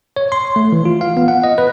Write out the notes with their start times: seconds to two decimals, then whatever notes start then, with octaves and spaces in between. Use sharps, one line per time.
0.16 C#5
0.32 C6
0.56 A3
0.72 E3
0.85 F4
1.01 F5
1.17 B3
1.28 F#5
1.44 D#5
1.58 B4